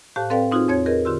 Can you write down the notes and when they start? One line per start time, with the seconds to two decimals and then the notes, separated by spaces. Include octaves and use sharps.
0.16 A2 G4 C5 F5 A5 F#6
0.30 C4 A4 B4 D5 F5 G5
0.51 C4 D#4 F4 F#4 G#4 C5
0.68 E2 C4 C#5 G#6
0.86 F4 G4 G#4 A#4 B4 D#5
1.05 D3 F4 G4 C6 E6